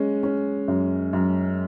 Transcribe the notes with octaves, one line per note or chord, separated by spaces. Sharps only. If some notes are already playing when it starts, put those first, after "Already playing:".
Already playing: G#3 C#4
C#4
F#2
F#2